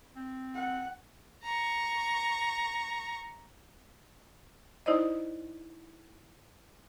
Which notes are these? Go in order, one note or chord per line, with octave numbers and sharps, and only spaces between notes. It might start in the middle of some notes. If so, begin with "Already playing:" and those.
C4
F#5
A#5 C#6
D#4 E4 C5 D5 D#5